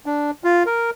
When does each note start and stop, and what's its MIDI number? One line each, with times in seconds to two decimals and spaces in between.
0.06 0.31 62
0.44 0.63 65
0.66 0.90 70